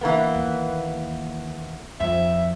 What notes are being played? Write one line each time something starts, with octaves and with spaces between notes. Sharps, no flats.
E3 A#3 B3
D#2
F2 E5